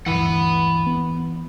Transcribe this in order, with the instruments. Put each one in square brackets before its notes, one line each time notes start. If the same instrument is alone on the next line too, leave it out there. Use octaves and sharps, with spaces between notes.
[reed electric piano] D2 G2 [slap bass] E3 [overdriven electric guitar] F#5 B5
[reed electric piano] B3